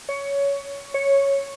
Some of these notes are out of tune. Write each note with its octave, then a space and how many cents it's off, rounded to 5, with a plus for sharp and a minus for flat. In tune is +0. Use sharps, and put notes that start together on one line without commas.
C#5 +15
C#5 -5